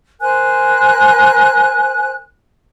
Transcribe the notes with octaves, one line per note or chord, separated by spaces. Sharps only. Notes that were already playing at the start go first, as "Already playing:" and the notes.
A#4 C5 G#5 F#6